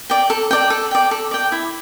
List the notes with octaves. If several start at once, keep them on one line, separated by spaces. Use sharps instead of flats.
D5 G5
A4
D5 G5
A4
D5 G5
A4
D5 G5
E4